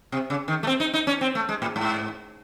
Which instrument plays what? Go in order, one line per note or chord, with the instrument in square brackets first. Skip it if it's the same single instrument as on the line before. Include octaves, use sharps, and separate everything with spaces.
[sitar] C3
C#3
D#3
A3
C4
D#4
D#4
C#4
C4
A3
G#3
A2
G#2